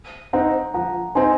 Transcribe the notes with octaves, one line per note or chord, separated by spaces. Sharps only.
C4 D#4 F#5 A#5
F3 F#5 A#5
C4 D#4 G#5 C6